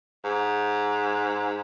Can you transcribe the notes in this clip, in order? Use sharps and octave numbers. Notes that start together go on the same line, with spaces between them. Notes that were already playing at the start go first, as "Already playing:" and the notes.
G#2